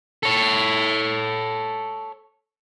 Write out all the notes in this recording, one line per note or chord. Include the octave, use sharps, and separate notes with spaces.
A4 C#5